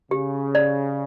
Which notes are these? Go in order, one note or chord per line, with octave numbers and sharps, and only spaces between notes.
C#3 G4
D5